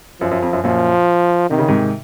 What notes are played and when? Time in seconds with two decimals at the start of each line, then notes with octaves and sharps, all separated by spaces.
0.21 F#2 F3
0.31 F#2
0.42 F2
0.53 F#2
0.64 F#2 A#2 F3
1.50 C3 D#3
1.59 C#3
1.68 G#2 C3